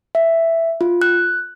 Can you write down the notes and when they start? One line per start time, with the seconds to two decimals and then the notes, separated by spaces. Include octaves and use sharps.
0.15 E5
0.81 F4
1.02 F#6